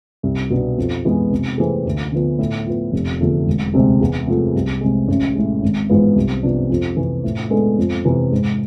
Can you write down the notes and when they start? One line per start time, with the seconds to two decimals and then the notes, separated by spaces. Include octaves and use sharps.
0.23 C2
0.50 B2 B3 D4
0.78 F2
1.05 E3 G#3 B3
1.31 C3
1.58 E3 A3 C4 G#4
1.86 D2
2.12 D3 F3 B3
2.39 A2
2.66 F3 B3
2.93 F1
3.20 E2 D3 F3 A3
3.46 E1
3.73 D2 C3 G#3 C4
4.01 E2
4.27 C3 F3 A3
4.55 C2
4.81 C3 G#3
5.08 A1
5.35 A2 G#3
5.63 G#1
5.89 G#2 E3 B3 F4
6.16 C2
6.43 C3 F3 B3 D4
6.70 F2
6.97 C3 E3
7.24 A2
7.50 G#3 B3 D4 A4
7.78 F2
8.05 C3 E3
8.32 G#2